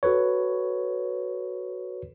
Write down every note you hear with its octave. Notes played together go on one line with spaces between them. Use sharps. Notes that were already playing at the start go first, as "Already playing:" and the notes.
F#4 A4 B4 C#5